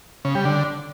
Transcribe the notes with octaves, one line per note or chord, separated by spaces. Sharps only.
C#3
G3
D3